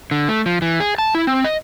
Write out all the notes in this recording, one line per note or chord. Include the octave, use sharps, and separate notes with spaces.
D3
A3
F3
E3
G#4
A5
E4
C4
D#5